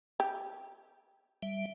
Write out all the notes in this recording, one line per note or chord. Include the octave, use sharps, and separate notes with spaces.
G4
G3 E5